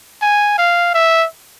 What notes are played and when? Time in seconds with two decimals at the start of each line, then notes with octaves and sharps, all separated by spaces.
0.22 G#5
0.58 F5
0.94 E5